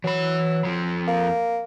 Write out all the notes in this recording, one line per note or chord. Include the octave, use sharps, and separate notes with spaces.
E3 F#3 B5
F2 F3
A#3